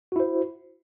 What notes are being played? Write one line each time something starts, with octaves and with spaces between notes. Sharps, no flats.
E4 F#4 C5